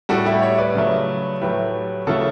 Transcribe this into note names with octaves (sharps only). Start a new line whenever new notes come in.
A2 G3 F#4 A4
E4 G4
C#5 E5
B4 D5
C#3 F#3 A3
A2 F#3 A3 G4 B4
C#3 E3 A3 F#4 A4